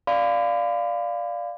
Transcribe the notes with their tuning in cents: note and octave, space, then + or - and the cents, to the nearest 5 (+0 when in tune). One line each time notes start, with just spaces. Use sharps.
D5 +0 F5 +0 B5 +40